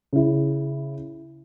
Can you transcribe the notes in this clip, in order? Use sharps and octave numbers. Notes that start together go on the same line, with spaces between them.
C#3 E4